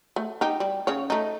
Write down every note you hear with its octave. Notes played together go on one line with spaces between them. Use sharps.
A3
D#4 G4
G3
C#3 C#5
A3 D#4